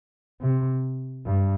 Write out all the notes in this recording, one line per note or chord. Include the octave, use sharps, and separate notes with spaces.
C3
G2